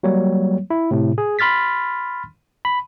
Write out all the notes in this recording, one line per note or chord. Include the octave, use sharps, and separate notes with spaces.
F#3 G3 A#3 C#5
E4
A2 C3
G#4
B5 C6 F6 A6 B6
B5